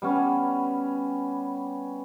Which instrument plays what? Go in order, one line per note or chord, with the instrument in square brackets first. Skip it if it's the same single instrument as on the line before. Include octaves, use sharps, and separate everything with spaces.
[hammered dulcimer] G3 B3 C#4